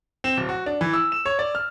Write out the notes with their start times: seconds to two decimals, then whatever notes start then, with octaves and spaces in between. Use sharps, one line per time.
0.24 C4
0.37 D1
0.49 F#4
0.66 D4
0.81 E3
0.94 E6
1.12 E7
1.26 C#5
1.39 D5
1.55 F6